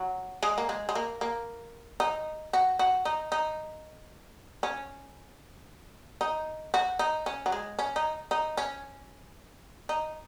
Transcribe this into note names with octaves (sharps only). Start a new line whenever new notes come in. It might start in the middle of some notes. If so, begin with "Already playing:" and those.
Already playing: F#3
G#3
A#3
G#3
G#3
A#3
A#3
D#4
F#4
F#4
D#4
D#4
C#4
D#4
F#4
D#4
C#4
F#3
G#3
C#4
D#4
D#4
C#4
D#4